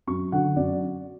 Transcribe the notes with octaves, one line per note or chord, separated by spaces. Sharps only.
F#2 C#6
D3 F#3 F#5
F#2 D5